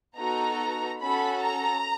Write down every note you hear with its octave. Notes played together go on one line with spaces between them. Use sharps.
B3 D#4 F#4 A4 A#5
C#4 F#4 A4 B5
A#5